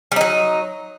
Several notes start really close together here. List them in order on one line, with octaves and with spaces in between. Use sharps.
G3 D#4 F#3